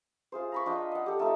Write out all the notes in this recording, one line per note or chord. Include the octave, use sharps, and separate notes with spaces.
F4 G#4 C5
A#5 B5 C#6
D4 F4 D#5 G5
D#5 F#5
G4 A4
A3 D#4 F4 A4